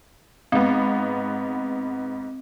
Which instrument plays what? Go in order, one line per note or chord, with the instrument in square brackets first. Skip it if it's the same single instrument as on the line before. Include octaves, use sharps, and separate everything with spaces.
[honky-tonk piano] G#2 B3 [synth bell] C4